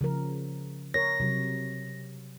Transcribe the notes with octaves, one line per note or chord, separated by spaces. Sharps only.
C#3 F3 A#4
A#4 C#5 A#6
C3 F#3